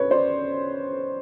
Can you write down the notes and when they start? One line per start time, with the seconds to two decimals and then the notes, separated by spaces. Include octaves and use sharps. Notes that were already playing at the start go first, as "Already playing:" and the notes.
Already playing: F#2 C#4 B4 C#5
0.11 C5 D5